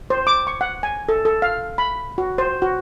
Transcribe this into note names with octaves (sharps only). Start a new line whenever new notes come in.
C5
D6
C#6
F#5
G#5
A4
A4
F5
B5
F#4
C5
F#4